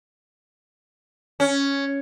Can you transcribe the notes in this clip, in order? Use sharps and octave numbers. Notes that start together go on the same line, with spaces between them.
C#4